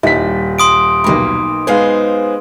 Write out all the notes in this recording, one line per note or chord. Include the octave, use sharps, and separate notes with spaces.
D#1 G3 D#4 E4 B6
C6 D#6 D7
B1 A#3 D#4 G4 B5
G#3 B3 D#4 G#4 C5 F5